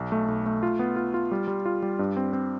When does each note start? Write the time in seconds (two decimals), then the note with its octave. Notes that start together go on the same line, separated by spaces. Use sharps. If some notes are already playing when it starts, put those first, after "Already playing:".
Already playing: B1
0.12 A3
0.28 B1
0.46 A3
0.63 F4
0.79 B3
0.96 F4
1.14 F4
1.31 G3
1.48 G3
1.66 F4
1.82 G3
1.99 G2
2.17 C4
2.33 C4